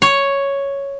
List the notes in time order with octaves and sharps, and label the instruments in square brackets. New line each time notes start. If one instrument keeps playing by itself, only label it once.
[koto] C#5